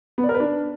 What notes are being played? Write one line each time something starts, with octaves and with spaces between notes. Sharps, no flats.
B3
D5
A#4
B4
D4